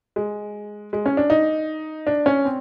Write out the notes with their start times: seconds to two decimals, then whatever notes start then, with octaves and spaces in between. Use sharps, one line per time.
0.16 G#3
0.93 G#3
1.06 C#4
1.17 D4
1.30 D#4
2.07 D4
2.26 C#4
2.45 C4